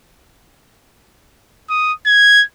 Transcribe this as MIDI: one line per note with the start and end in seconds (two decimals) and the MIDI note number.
1.70 1.93 87
2.06 2.44 92